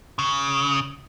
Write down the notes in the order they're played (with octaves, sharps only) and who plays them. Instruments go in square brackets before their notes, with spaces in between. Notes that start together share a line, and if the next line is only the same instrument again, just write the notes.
[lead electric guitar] C#3